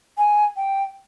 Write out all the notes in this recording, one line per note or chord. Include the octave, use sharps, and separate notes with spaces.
G#5
G5